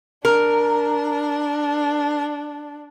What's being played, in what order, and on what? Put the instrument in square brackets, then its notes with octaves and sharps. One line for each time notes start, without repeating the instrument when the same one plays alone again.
[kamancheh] D4 [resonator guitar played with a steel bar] A#4